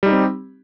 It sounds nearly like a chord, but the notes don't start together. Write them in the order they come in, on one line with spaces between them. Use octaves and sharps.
G3 D#4 G4 C4